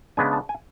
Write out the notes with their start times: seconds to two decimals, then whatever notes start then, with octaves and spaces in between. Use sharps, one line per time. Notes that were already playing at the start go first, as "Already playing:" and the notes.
0.17 C#3 G#3 B3 D4 G#5
0.33 A5
0.49 G#5